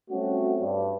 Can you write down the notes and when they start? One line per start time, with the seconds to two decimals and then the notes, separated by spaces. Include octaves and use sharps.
0.10 G3 A3 C4 C#4 F#4
0.61 G2